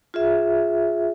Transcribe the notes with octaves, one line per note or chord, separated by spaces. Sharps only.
F4 G#4 E5